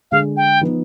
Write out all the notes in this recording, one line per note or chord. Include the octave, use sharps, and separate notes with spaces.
D3 G#3 D4 G#4 F5
G5
F3 B3 D#4